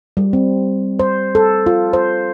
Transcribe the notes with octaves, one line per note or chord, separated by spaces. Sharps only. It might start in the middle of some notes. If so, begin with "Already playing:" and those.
G3
C4
C5
A4
F4
C5